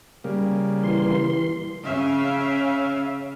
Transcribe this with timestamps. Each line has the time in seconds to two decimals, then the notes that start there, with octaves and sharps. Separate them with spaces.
0.24 C#3 G3 A#3
0.83 E3 C6
1.84 C#3 E5 F5